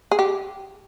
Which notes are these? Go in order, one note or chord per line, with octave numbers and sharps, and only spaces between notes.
G#4
G4